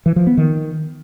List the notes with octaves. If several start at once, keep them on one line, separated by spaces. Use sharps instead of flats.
E3
F3
B3
D#3